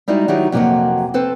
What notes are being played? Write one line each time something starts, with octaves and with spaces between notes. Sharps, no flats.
G3 G#3 D#4 E4 F#4 D5
D#3 F#3 D#4 E4 F#4 G4
F2 C3 F#3 A#3 D#5 F#5
C4 A4 B4 C5